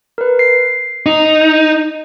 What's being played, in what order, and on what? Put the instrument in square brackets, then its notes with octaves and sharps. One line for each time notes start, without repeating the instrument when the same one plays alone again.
[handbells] A#4 B4
C7
[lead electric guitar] D#4
[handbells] G6